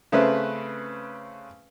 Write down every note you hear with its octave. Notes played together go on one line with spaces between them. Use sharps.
C#3 A3 C4 C#4 B4